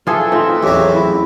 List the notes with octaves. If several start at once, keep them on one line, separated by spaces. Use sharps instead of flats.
F2 E3 F4 G#4 A4 E5
A3 C4 D#4 F4
A1 E2 F#3 G4 C#5
E4